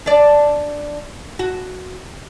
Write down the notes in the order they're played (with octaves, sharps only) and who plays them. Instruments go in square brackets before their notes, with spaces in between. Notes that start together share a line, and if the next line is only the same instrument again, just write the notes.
[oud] D4 D5
F#4